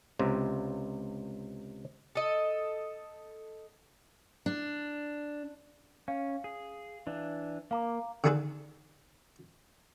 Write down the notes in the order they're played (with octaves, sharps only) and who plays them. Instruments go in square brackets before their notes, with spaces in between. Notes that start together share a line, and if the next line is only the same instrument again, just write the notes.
[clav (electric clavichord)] C#2 C3
[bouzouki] A4 D#5
[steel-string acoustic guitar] D4
[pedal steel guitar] C#4 [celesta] F5
[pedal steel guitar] G#4
E3 D4
[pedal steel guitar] A#3 [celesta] F5 A#5 D6
[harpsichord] D3 D#3 D4 G#4 A4 B4